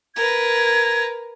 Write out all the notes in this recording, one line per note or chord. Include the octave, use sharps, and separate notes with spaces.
A#4 B4 G#6